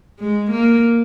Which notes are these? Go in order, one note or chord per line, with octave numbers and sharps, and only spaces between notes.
G#3
A#3